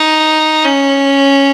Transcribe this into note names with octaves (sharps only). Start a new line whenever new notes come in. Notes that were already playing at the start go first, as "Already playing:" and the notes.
Already playing: D#4
C#4